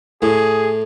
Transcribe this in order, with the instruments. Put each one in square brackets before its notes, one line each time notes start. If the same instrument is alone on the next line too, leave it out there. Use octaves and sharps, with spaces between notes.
[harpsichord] A2 [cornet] G#4